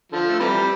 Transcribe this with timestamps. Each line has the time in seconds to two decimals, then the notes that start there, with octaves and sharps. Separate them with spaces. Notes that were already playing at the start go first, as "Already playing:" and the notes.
0.12 D3 F3
0.28 A3
0.39 C3 E3 G3